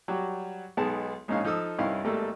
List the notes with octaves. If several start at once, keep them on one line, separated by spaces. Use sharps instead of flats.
F#3 G3 F#4 G4
B1 G#3 B3 D#4 G#4 A5
A#1 G#2 G#3 C#4 D#4 F5
F3 D#4 A4 D#6 E6
C2 G2 C#4 D#4 E4 F5
G#1 G3 A3 A#3 A4